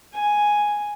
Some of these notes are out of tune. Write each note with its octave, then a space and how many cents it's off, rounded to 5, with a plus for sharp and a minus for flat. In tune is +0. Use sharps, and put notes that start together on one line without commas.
G#5 +0